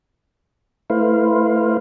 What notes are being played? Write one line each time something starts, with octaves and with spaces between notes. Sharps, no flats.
A3 E4 B4 C5 F5